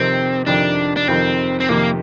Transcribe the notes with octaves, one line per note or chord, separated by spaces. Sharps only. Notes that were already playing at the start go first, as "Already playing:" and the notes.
Already playing: F2 C3 D#3 C4
F2 C3 D#3 D4
D4
F2 C3 D#3 C4
C4
F2 C3 D#3 A#3